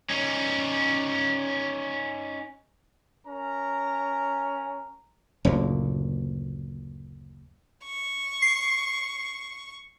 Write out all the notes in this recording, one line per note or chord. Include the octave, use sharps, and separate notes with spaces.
C#4 D#4
C#4 A#4 A#5
F#1 D2 A#2
C#6
C7